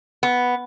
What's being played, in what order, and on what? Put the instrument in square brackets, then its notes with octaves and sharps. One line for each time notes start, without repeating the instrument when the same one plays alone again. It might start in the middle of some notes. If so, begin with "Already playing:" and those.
[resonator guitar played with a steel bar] B3